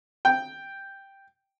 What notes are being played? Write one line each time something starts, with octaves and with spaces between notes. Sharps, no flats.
G5